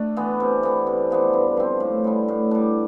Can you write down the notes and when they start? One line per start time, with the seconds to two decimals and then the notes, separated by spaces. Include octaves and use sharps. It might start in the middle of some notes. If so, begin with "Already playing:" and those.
Already playing: A3 D4
0.17 E3 B3
0.40 C3
0.63 E3 B3
0.87 C3
1.10 F3 B3 D4
1.33 G2
1.57 F3 C4
1.80 A2
2.04 G3 B3 D4
2.28 A2
2.51 G3 D4